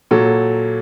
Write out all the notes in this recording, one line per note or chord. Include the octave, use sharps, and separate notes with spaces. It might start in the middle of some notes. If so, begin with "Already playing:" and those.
A#2 F#3 A4